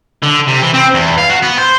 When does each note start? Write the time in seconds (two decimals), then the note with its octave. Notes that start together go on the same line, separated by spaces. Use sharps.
0.23 D3
0.48 C3
0.62 E3
0.74 C4
0.94 E2
1.18 F5
1.29 F#4
1.43 B3
1.58 C5